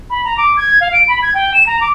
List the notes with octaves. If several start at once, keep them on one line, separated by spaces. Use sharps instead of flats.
B5
A#5
D6
G#6
F5
D7
B5
G#6
G5
E7
A#5
D6